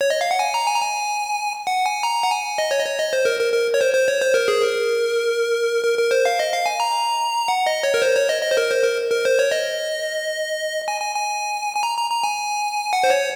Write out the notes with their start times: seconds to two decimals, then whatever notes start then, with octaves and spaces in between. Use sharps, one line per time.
0.01 C#5
0.10 D#5
0.21 F5
0.31 F#5
0.39 G#5
0.54 A#5
0.67 G#5
0.75 A#5
0.81 G#5
1.67 F#5
1.86 G#5
2.03 A#5
2.23 F#5
2.31 G#5
2.58 D#5
2.71 C#5
2.79 D#5
2.85 C#5
2.99 D#5
3.13 C5
3.25 A#4
3.40 A#4
3.53 A#4
3.74 C#5
3.81 C5
3.93 C5
4.08 C#5
4.21 C5
4.34 A#4
4.48 G#4
4.62 A#4
5.84 A#4
5.98 A#4
6.11 C5
6.25 F5
6.39 D#5
6.53 F5
6.66 G#5
6.80 A#5
7.48 F#5
7.66 D#5
7.83 C#5
7.94 A#4
8.02 C5
8.16 C#5
8.29 D#5
8.42 D#5
8.51 C5
8.57 A#4
8.71 C5
8.83 A#4
9.10 A#4
9.25 C5
9.39 C#5
9.51 D#5
10.88 G#5
11.01 G#5
11.15 G#5
11.76 G#5
11.83 A#5
11.97 A#5
12.10 A#5
12.24 G#5
12.93 F#5
13.04 C5
13.10 C#5